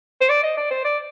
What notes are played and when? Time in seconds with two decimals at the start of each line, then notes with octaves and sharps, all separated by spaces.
0.21 C5
0.29 D5
0.43 D#5
0.57 D5
0.71 C5
0.85 D5